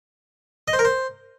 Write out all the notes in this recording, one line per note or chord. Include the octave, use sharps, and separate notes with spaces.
D#5
C5
A#4
C5